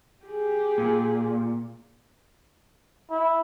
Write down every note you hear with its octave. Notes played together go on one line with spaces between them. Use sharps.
G4 G#4
A#2
E4